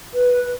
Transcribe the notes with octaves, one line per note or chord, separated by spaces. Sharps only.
B4